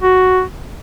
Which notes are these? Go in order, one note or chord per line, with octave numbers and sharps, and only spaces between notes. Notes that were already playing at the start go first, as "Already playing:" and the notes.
F#4